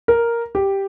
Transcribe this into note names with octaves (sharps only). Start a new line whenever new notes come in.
A#4
G4